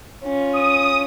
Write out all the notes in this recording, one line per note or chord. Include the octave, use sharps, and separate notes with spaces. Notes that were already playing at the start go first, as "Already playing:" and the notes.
C#4 F4
D#6